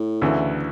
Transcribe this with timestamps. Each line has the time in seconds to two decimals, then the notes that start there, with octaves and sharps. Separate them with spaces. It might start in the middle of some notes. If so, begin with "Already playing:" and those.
Already playing: A2
0.22 D2 C#3 E3